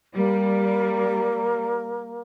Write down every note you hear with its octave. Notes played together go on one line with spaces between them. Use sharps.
G3 A#3